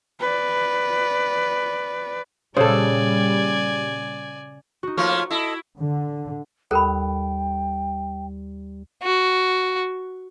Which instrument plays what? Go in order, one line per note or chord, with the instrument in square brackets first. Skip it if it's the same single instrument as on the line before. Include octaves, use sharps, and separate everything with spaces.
[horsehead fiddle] B4 D5
[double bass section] A#2 G3 [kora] C#3 [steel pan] A4 C5 [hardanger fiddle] D5 G#5
[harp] D#4 F#4
[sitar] F3 A3 A#3 [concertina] F4 C#5 F6 [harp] C#6
[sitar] E4 [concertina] A4 D#5
[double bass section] D3
[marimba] D#2 F#6 [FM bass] G3 [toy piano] A4 A#4 B5 [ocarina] G5
[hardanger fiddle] F#4